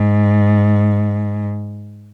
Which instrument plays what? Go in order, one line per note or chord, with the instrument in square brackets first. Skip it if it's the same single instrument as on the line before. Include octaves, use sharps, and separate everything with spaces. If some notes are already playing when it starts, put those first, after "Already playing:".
Already playing: [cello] G#2